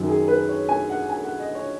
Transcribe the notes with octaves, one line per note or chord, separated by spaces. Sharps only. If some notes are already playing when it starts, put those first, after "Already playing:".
Already playing: F#2 D#3 F#3
G#4
B4
C#5
G#5
F#5
G#5
F#5
D#5
C#5